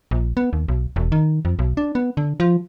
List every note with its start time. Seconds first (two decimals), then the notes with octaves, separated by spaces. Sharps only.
0.11 A#1
0.37 B3
0.53 D#2
0.68 B1
0.96 E1
1.12 D#3
1.45 F2
1.59 B1
1.77 D4
1.95 B3
2.17 D3
2.40 F3